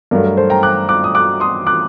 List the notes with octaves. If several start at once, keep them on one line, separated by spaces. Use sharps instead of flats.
G2 F#3 A3 A#4
A#4
A4 C5
G5 A#5
D6 F#6
D6 F#6
D#6
D6 F#6
C6 D#6
D6 F#6